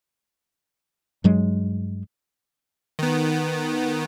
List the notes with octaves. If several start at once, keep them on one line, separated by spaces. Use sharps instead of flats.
G2 F#3 G#3
D#3 B3